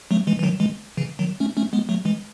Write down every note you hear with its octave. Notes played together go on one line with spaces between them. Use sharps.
F#3 A3
E3 G#3
E3
D#3 F#3
E3 G#3
C#3 E3
D#3 F#3
A3 C#4
A3 C#4
G#3 B3
F#3 A3
E3 G#3